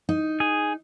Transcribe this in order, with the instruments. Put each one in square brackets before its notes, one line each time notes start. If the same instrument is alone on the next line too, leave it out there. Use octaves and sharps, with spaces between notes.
[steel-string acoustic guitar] D#4
[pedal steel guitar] G#4